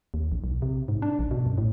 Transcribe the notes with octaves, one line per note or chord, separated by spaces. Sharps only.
D#2
A#1
B1
C3
G#2
D4
A#1
B2
F#2
A2